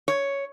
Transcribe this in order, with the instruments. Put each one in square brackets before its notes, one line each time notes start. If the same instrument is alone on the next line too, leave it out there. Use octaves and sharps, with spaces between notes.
[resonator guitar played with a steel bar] C#5